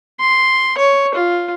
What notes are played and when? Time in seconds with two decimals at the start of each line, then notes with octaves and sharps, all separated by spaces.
0.20 C6
0.78 C#5
1.15 F4